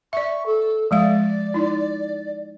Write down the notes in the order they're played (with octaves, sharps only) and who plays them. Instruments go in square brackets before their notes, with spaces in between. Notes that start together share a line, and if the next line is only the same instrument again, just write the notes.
[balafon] D5 E5 [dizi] C#6
[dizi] A4
[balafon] F3 G#3 F5 [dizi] D5
[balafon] D#4 E4